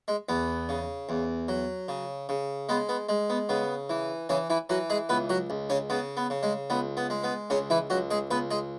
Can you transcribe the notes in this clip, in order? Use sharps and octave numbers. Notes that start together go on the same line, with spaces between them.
G#3
E2 B3
C#3
E2
F#3
C#3
C#3
G#3 B3
B3
G#3
B3
C#3 B3
E3
C#3 E3 C#4
E3 E4
E3 F#3 F#4
G#3 G#4
C#2 B3 B4
F#3 F#4
C#2
C#3 C#4
C#3 B3
B3
C#3
G#3
C#2 B3
B3
G#3
B3
C#2 C#3 C#4
E3 E4
C#2 F#3 F#4
G#3 G#4
C#2 B3 B4
G#3 G#4